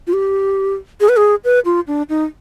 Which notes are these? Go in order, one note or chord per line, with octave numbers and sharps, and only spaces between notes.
F4
G4
G#4
B4
G#4
B4
F4
D4
D#4